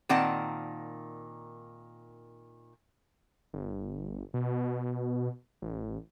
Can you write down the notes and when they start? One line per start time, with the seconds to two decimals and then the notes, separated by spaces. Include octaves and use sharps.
0.09 A#2 D#3 C4 D5 F#5 A5
3.54 G1
4.34 B2
5.62 A1